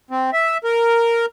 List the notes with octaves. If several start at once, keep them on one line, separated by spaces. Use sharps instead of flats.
C4
E5
A#4